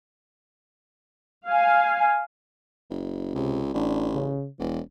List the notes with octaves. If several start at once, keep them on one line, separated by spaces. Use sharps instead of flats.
F5 G#5
F#1
C#2 C3
A1 D4
C#3
E1 E3